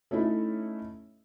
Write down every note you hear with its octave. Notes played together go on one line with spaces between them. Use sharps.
A3 C#4 D#4 E4 A4